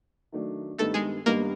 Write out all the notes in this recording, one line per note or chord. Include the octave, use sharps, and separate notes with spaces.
D#3 F#3 A3 D4
G2 D#3 G3 A3 B3 D#4 A4
G#3 G#4
G2 D#3 G3 A#3 B3 D#4 A#4